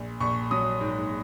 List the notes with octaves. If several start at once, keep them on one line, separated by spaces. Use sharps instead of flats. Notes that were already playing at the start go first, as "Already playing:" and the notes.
Already playing: A#1
A#1 C#6
F#3 D#6
G#2